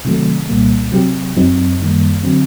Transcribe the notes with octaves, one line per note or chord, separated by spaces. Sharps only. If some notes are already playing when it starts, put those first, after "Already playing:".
C3 D#3 F#3 A3
C2 A#2 G3 A#3
C3 F#3 C4 G4
F#2 F#3 C4 D#4
F#2 D#3 G3 A#3
D3 F#3 C4